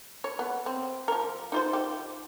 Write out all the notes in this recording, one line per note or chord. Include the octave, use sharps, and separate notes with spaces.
C#5
B3
C4
F3 A#4
D#4 F4 C5
D#3 G4